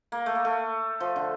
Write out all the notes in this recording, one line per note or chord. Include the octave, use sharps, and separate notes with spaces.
A#3
A3
A#3
A3
F3
D3